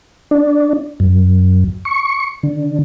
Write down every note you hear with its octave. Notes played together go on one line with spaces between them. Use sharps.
D4
F#2
C#6
D3